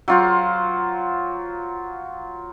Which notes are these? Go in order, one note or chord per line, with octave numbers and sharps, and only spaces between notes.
F#3 F4 C5